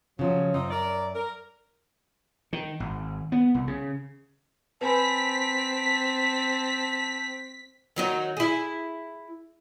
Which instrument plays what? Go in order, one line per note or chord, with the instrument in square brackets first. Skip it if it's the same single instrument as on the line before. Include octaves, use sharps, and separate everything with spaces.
[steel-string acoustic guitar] C#3 F3 C#4 [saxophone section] F#3
[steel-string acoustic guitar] F#2 [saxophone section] C4 D#4 F4
[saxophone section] A#4 D5
A#4
[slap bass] D#3
G#1
B3
C2
C#3
[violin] C4 [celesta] B4 G#5 B5 [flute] A5 [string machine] B6
[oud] D#3 F#3 D#4
E4 G#4